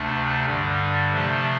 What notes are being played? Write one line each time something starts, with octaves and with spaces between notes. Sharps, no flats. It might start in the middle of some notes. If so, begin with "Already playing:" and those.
Already playing: D2 C3 A3 D4
G2 D3 G3
C3 F3 A3 D4